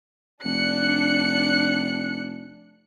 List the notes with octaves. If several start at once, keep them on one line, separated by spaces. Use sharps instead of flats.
F1 D4 F#6 C#7